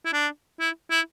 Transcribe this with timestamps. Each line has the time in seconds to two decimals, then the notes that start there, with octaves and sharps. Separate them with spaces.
0.05 E4
0.13 D4
0.60 E4
0.91 E4